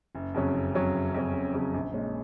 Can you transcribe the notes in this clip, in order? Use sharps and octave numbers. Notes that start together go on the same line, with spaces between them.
F#1
F2 C#3 F#3 C#4
F#1
F2 C#3 F#3 C#4
F#1
F2 C#3 F#3 C#4
F#1
F2 C#3 F#3 C#4
A#1
A#2 G#3 C#4